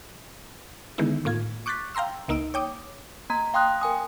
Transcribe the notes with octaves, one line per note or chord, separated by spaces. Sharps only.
D3 D#3 G#3 B3 D#4 E4
A2 A#3 F4 G#6
C#6 D6 F#6 G6 A6 B6
F5 G5 A#5 C6 E6
C#2 A#3 D#4 E6 D7
C#5 G5 D6 D#6
A#3 A#5
F5 G5 C6 D#6 F#6
A#4 G#5 D#6